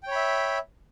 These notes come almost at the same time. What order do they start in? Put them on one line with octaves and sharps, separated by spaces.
G5 C#5 B5 E5